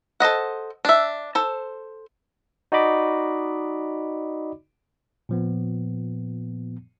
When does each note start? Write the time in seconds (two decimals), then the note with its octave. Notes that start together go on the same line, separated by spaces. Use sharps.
0.20 A4 C5 D#5 F#5
0.85 D4 E5
1.35 A4 C5
2.72 D#4 F#4 D5 D#5 B5 D6
5.29 A#2 F3 B3